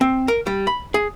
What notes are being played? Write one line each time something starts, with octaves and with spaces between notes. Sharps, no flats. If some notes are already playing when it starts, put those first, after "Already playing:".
C4
A#4
G3
B5
G#4